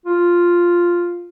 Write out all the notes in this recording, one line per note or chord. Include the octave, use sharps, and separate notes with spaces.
F4